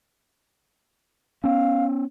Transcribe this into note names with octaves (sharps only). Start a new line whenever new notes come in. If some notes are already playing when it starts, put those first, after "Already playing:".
B3 C#4 F5